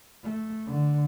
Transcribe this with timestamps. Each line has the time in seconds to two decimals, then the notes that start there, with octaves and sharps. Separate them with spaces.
0.24 A3
0.66 D3